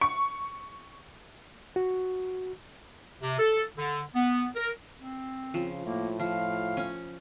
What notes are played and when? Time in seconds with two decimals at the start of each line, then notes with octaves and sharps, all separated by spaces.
0.01 C#6
1.76 F#4
3.22 C3
3.39 A4
3.77 D3
4.16 B3
4.56 A#4
4.97 C4
5.54 C#3 F3
5.85 A2 A#3
6.20 F3 F5
6.77 C#4